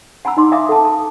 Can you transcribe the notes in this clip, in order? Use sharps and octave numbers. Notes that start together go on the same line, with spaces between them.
F#5 G#5 A#5 B5 E6
D#4 D#5 C6 D6
E5 F5 G5 G#5 D6 D#6
A4 F#5 A5
D#6